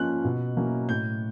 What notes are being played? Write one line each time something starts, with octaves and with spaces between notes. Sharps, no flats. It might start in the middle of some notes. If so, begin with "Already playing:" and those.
Already playing: F3 A#3 C#4 F4 F#6
B2
F#3 A#3 C#4 E4
A2 G6